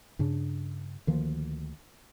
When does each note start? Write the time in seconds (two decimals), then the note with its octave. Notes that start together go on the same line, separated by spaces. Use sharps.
0.19 G2 C#3 D4
1.07 D2 D#3 F3 A#3